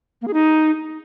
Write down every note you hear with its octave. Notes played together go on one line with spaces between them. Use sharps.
A#3
G#4
D#4